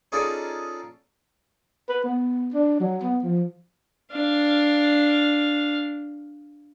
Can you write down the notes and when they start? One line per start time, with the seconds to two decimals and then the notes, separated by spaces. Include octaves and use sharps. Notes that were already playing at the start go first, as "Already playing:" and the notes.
0.12 C#4 D#4 F4 G#4 A4 D5
1.89 B4
2.04 B3
2.54 D4
2.80 F#3
3.03 B3
3.24 F3
4.13 D4 F5